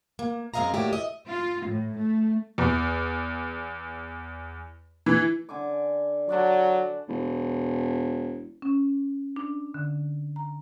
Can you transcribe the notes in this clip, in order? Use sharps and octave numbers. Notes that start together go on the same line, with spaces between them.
A#3
F#2 G#3 C4 D#5 F5 A#5
A2 A#3 F#4 G4 D5
D#5 E5
F4
A2
A3
E2
E3
D3 G#5 D6
F#3 D5 F#5 A5
E1
C#4
D4
D3
A#5